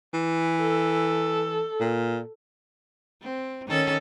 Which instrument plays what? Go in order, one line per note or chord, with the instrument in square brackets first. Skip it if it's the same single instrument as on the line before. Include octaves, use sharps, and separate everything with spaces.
[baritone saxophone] E3
[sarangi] A4
[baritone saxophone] A#2
[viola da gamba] C4
D#3 C#4 A4